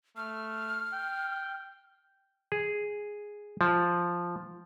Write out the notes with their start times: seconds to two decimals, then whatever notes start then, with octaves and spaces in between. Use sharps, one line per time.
0.17 A3 F6
0.93 G5
2.52 G#4
3.61 F3